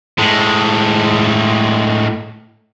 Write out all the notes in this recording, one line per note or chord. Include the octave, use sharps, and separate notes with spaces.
A2 G#3